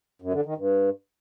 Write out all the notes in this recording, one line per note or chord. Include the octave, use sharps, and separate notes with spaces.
F#2
D3
D#3
G2